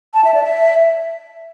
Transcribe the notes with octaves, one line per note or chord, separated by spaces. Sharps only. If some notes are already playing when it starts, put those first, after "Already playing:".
A5
E5
D5
E5